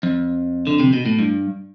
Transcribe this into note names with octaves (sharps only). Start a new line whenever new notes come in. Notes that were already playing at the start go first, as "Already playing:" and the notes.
F2
D3
C3
B2
A2
G2